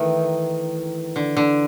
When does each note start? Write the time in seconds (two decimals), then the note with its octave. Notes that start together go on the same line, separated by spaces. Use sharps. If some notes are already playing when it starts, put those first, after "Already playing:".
Already playing: D#3 E3 A3
1.16 D3
1.37 D3